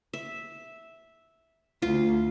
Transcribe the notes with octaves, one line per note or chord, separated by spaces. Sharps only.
E5
D2 F4